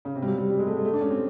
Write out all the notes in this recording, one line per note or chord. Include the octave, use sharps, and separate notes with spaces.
C#3
C3
G3
F#3
G3
G3
G#3
A3
G#3
A3
D4
C#4
C4